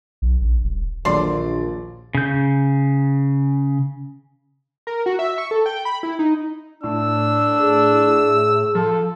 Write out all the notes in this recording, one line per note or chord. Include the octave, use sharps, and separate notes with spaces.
B1
A#1
D#1
A#1 D#2 D3 F#3 D5 C6
C#3 G6
A#4
F#4
E5
C#6
A4
G5
B5
E4
D#4
A2 D4 E6
G#4
F3 A4